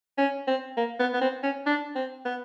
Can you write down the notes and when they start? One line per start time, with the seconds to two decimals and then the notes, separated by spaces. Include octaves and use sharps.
0.18 C#4
0.47 C4
0.77 A#3
0.99 B3
1.14 B3
1.21 C4
1.43 C#4
1.66 D4
1.95 C4
2.25 B3